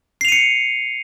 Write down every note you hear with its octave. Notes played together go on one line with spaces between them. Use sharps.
C7 C#7 D#7 F7